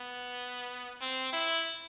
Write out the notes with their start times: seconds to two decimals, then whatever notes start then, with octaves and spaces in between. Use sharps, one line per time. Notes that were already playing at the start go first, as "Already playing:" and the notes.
Already playing: B3
1.01 C4
1.33 E4